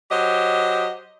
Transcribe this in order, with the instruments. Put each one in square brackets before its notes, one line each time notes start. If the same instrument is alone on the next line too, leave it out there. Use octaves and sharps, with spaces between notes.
[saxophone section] F#3 G4 C5 D#5